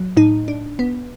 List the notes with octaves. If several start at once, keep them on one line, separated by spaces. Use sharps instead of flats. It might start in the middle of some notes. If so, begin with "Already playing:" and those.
Already playing: F#3
A2 D#4
D4
B3